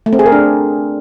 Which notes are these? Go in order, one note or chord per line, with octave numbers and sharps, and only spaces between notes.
A3
C4
G#4
A#4
D4